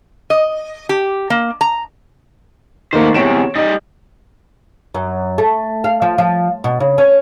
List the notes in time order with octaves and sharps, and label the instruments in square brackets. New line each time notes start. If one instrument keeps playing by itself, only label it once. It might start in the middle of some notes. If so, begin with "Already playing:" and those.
[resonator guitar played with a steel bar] D#5
G4
A#3
A#5
[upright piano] D#3 A#3 [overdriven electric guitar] A3 C5
[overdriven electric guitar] E2 C3 [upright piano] C#5 D7 E7
[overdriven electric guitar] G3 D#5 [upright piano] D#4
[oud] F#2
A3
F5
F3
F3
B2
C#3
C#4